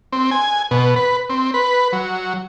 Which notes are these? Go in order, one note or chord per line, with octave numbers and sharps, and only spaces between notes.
C4
G#5
B2
B4
C4
B4
F#3